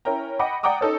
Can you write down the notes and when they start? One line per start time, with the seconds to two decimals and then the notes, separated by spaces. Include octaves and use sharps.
0.05 C#4 E4 A#4 G5 A#5
0.39 D#5 F#5 G5 B5 D6
0.63 D5 F#5 G5 A#5 D6 D#6
0.81 C#4 D#4 A4 C#5